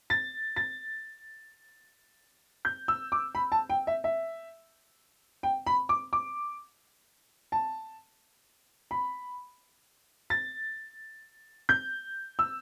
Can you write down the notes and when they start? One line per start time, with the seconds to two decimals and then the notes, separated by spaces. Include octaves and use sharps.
0.10 A6
0.56 A6
2.65 G6
2.88 E6
3.12 D6
3.35 B5
3.52 A5
3.70 G5
3.87 E5
4.04 E5
5.43 G5
5.67 B5
5.89 D6
6.13 D6
7.52 A5
8.91 B5
10.30 A6
11.69 G6
12.39 E6